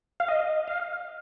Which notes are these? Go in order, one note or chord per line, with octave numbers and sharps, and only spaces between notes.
F5
D#5
F5